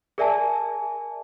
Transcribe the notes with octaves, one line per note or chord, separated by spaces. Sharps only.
G#4 A#4 D5 E5 G#5 A5